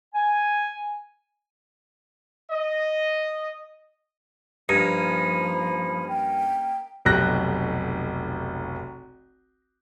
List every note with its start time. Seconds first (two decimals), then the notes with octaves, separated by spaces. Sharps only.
0.14 G#5
2.51 D#5
4.69 G2 F3 A#3 C#4 D#4 B5
6.09 G5
7.05 F1 B1 G4 F#6 A#6